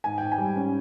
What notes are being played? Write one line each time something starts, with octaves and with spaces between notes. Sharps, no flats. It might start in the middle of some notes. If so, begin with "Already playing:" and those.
G#2 G#5
G#2 G5
G#5
G3
C#4